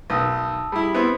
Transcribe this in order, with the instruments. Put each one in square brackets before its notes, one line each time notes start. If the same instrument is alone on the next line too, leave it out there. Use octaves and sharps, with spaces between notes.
[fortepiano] B1 D#3 [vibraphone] A5 D#6 E6
[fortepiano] G3 E4
B3 C4 E4